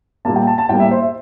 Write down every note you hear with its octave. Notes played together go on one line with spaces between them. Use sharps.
A#2 G3 A#3 A5
G5
A5
A5
A2 G3 A#3 G5
E5
C5
E5